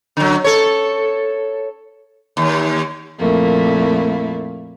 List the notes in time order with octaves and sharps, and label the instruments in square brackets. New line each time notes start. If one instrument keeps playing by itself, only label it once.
[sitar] D3 F#3
A4 C#5
D#2
[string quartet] F2 A#2 A3 A#3 E4